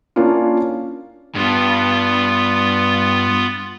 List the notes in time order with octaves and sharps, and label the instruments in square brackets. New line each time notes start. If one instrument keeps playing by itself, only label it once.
[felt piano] A#3 C#4 D4 E4 F4
[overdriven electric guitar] G2 [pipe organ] B3 F4